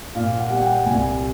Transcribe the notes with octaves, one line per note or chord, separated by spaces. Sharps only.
A#2 F5
F#5
G3
F#5
G5
C2 G#5